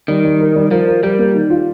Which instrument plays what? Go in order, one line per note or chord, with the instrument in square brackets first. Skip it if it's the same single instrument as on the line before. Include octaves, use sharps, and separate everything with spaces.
[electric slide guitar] D#3 [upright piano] G3
[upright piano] G3
A#4
G3
[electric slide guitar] F3 [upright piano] A#4
[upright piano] A#4
[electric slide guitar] G3 [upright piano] A#4
[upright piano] A#3
D#3
F4